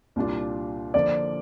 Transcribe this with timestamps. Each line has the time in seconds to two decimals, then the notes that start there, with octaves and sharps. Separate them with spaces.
0.16 C2 A#2 G3 D4 F4
0.94 D3 F3 A#3 D5